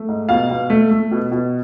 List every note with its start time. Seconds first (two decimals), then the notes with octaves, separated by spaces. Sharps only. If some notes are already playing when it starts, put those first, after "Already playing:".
Already playing: A3
0.08 G#2
0.29 B2 F5
0.50 B2
0.70 A3
0.91 A3
1.11 B2
1.32 B2